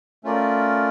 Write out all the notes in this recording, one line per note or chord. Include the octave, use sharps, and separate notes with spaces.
A3 C#4 F4 A#4 D5